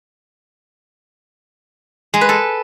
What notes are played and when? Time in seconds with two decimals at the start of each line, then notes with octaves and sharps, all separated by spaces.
2.14 G#3
2.21 B4
2.29 A4